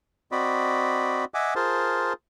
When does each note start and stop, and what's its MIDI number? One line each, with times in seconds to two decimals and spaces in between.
0.32 1.25 60
0.32 1.25 66
0.32 1.25 74
0.32 1.25 75
0.32 1.25 83
1.34 1.54 75
1.34 1.54 76
1.34 1.54 78
1.34 1.54 80
1.34 1.54 86
1.56 2.13 65
1.56 2.13 68
1.56 2.13 70
1.56 2.13 72
1.56 2.13 81